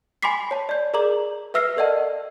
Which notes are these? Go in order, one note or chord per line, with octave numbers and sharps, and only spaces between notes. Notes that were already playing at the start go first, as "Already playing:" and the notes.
G#5 B5 C6 D6 B6 C7
C#5 A5
D5 G6
G#4 A#4 D5 A#5 D6 F#7
B4 E5 E6 F6 A#6 C7
A4 A#4 D5 D#5 F#5 A5